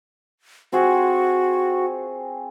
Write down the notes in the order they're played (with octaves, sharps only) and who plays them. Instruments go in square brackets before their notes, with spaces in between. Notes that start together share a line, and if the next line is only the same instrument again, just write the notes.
[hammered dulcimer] C4 F4 G#4 [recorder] F#4